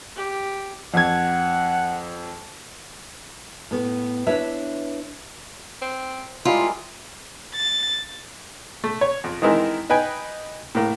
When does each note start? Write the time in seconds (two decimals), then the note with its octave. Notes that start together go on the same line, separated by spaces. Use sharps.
0.16 G4
0.94 F2 F#5 G#6
3.71 A2 B3
4.27 D4 E4 B4 C#5 E5
5.82 C4
6.45 G3 G#3 E4 F4 A#4
7.55 A6
8.84 A3
9.01 C#5
9.24 F2
9.42 D#3 E3 G#3 C4 E4 A#4
9.90 D#4 B4 G5 G#5
10.75 A2 A#3